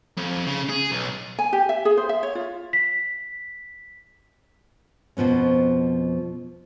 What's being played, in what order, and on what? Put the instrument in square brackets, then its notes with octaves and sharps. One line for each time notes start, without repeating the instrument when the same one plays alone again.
[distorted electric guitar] F2
C#3
G#4
B1
[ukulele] G#5
G4
E5
G#4
C5
E5
C#5
F4
[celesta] B6
[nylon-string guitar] F2 B2 F3 B3 C#4